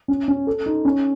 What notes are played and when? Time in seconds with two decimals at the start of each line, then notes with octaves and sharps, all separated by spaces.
0.08 C#4
0.28 C#4
0.47 A4
0.66 D#4
0.85 C#4